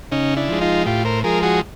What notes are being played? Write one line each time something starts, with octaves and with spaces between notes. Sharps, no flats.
C#3 C#4 D#4
D4 E4
F3 G#3
D#4 F4
A2 F4 G4
A#4 C5
F3 G#3 G#4 A#4
F#4 G#4